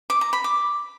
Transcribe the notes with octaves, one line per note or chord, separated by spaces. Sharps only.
D6
A#5
B5
D6